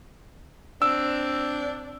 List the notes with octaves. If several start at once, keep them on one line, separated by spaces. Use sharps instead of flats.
C4 D4 E6